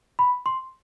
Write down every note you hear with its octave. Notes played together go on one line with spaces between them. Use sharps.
B5
C6